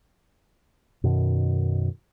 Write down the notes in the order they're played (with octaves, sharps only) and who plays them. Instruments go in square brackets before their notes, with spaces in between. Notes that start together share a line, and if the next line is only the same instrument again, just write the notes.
[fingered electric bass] F#2 B2 D#3